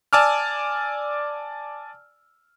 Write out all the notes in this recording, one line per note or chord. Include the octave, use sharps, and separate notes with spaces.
D5 G#5 A5 D6 E6 F6